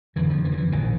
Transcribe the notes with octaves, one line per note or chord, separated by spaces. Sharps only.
F#1 F2 D3 E3
F3
E3
D#3
E3
A#1 A2 D#3